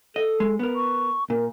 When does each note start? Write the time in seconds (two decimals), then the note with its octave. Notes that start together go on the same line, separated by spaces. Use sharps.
0.16 A4 D#5
0.40 G#3
0.59 B3 A#4
0.76 C#6
1.30 A#2 A#4